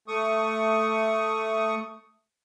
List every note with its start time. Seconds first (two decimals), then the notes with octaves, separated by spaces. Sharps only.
0.08 A3 C#6 D#6